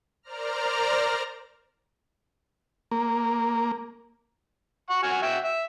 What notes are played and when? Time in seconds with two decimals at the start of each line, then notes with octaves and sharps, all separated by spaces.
0.23 A#4 C5 D5 A#5 F6
2.91 A#3
4.90 F#5 C#6
5.03 F#4 G#5 F6
5.23 F#4 E5 G5
5.45 E5